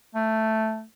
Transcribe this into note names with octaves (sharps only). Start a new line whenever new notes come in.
A3